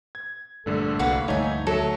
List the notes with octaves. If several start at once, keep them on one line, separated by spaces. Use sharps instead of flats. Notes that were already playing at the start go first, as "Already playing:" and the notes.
G#6
A#1 G2 D3 A3 A4
C2 A#3 F#4 B4 F5
D2 G2 A3 D#4 C#5 E5 G#5
F#3 A3 A4 E5